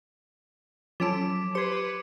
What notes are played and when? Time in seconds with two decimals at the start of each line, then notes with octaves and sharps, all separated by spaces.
1.00 F3 F#3 C#4 A4 D6 B6 D7
1.55 G4 B4 C5 C6 G#6 C#7